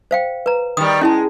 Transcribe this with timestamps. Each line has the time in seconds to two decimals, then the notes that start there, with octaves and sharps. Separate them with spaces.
0.11 C5 F5 G5
0.46 B4 A#5
0.77 D#3 G3 D#6
1.01 G#3 C#4 E4 A5